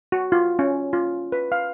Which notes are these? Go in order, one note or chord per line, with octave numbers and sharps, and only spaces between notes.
F#4
F4
C#4
F4
B4
F5